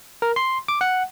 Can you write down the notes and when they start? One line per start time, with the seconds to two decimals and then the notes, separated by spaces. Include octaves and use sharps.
0.22 A#4
0.36 C6
0.68 D6
0.81 F#5